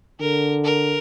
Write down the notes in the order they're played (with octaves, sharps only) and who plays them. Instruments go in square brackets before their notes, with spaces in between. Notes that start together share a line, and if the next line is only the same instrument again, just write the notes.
[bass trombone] D3 [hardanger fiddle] A#4
[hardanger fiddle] A#4